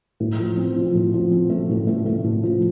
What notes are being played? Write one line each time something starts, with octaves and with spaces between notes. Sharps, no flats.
A2
F3
C4
F3
A2
F3
C4
A3
A2
A3
A3
A2
F3